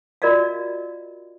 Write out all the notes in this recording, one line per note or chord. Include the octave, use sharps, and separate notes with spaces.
F4 F#4 A#4 D5 D#5 F5